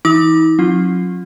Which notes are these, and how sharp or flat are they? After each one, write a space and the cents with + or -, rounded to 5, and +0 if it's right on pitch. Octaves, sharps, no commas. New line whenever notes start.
E3 +0 D#4 +45 D6 +15
F#3 -40 C#4 -35 F4 +0